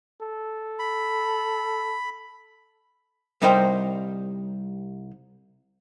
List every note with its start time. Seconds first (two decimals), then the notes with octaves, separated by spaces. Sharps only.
0.21 A4
0.79 B5
3.42 C2 G3 D#4 A#4 C5 G5